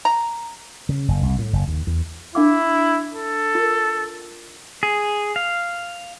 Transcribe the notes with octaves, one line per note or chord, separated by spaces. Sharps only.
A#5
C#3
F#1
C2
A2
F#1
D#2
E2
D4 E4 F5 D6
A4
F4 A#4
G#4
F5